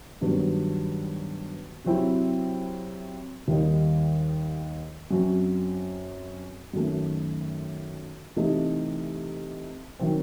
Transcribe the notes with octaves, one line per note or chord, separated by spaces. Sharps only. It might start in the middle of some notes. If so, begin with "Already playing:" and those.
G2 D#3 F#3 B3
C3 F#3 C4 E4
D#2 D#3 G3 D#4
F#2 F#3 C4
F#2 D#3 A3
C3 E3 A3 D#4
D#3 F#3 C4